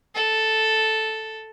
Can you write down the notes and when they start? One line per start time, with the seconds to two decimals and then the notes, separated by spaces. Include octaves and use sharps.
0.15 A4